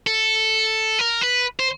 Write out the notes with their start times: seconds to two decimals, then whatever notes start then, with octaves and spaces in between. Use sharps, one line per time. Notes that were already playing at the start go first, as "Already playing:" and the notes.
0.07 A4
0.99 A#4
1.21 B4
1.59 C5